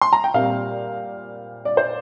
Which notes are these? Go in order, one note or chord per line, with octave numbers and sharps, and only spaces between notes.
C6
A#5
G5
A#2 G3 C4 F5
D5
C5